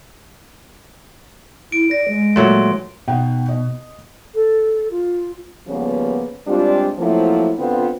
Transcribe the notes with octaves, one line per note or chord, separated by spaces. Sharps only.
E4 D7
D5 A#6
G#3
A#2 F#3 A3 C6
B2 D#4 F#5 G5
D#5
A4
F4
C#3 F3 G3 A#3 B3
G3 G#3 C4 D4 F4
F3 F#3 A3 A#3 C4 E4
D3 B3 C4 F4